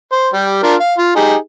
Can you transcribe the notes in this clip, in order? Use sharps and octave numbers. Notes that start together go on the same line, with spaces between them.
C5
G3 G4
D4 F4 A#4
F5
F4
D#4 G4 G#4